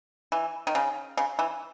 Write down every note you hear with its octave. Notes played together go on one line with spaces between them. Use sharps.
E3
D#3
C#3
C#3
E3